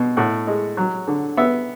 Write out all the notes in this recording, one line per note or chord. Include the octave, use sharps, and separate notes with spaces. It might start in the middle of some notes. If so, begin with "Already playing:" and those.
Already playing: B2
A2 F#5
G#3
F#3
D3
B3 E5